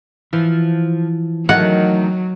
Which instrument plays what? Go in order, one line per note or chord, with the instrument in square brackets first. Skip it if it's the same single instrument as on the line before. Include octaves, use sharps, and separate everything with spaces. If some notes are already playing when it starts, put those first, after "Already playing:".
[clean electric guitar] E3 [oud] F3
[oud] D#3 A3 [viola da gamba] F#3 [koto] F#5